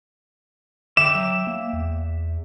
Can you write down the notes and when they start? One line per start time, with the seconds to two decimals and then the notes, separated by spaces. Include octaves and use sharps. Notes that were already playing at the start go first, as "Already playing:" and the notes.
0.97 D3 E5 G5 D6 E7
1.15 F#3
1.47 A#3
1.73 E2